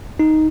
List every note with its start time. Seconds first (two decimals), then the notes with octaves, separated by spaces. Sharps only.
0.20 D#4